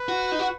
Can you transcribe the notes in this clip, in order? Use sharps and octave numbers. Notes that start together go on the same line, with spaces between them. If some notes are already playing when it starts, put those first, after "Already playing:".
Already playing: B4
F#4
D#4
F#4